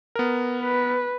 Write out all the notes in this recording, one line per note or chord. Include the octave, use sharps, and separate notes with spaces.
B3 A#4
B4